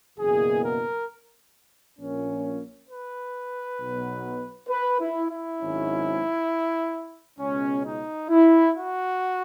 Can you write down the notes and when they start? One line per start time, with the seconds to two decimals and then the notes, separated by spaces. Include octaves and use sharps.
0.19 F#1 E2 B2 A#3 G#4
0.64 A#4
1.98 A#1 A#2 A#3 C#4
2.88 B4
3.79 B1 B2 F#3 B3
4.69 B4
5.00 E4
5.29 E4
5.59 G#1 G#2 F#3 C#4
7.39 C#2 B2 G#3 C#4
7.84 D#4
8.29 E4
8.74 F#4